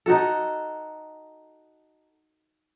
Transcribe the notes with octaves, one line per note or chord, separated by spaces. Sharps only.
D#4 F#4 A4